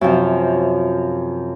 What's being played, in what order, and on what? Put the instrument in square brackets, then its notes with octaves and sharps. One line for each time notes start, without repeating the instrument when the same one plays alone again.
[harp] F#2 C3 F3